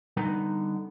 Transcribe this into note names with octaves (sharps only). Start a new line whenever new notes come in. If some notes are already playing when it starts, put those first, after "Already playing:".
D3 G3 B3 D#4 B4 A#5